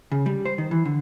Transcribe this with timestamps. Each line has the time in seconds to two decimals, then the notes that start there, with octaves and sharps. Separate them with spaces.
0.11 C#3
0.26 G3
0.45 C5
0.58 D#3
0.71 E3
0.85 D3